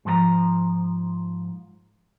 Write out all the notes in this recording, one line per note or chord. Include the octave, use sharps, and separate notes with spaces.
G#2 F3 A4 A#5